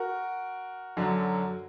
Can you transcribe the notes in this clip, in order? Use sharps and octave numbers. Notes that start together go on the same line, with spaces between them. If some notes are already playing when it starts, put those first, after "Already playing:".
Already playing: F#4 A#4
F#2 D3 F#3